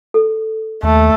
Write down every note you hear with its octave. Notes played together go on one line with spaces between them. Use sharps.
A4
D#2 A3